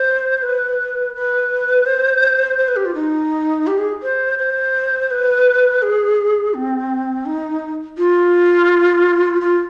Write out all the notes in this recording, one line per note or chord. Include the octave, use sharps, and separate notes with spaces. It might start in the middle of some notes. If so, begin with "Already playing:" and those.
Already playing: C5
B4
B4
C5
C5
B4
G4
F4
D#4
G4
G#4
C5
C5
B4
G#4
C4
D#4
F4
F4